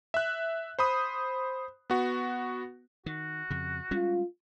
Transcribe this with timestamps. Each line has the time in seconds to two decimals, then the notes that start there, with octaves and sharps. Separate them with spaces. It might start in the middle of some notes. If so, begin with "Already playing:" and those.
0.14 E5 F#6
0.79 C5 B5 D#6
1.90 B3 F#4
3.06 D#3 F#4
3.50 F2 C#3
3.91 G3 G#3 C#4 F4